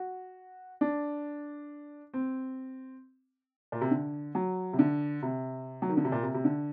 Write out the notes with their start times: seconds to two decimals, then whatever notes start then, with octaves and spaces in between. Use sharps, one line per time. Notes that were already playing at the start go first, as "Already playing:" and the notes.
Already playing: F#4
0.81 D4
2.14 C4
3.72 A#2
3.81 C3
3.91 D3
4.35 F#3
4.73 C3
4.79 D3
5.23 C3
5.82 F#3
5.89 D#3
5.97 D3
6.05 C3
6.12 A#2
6.23 C3
6.34 C3
6.45 D3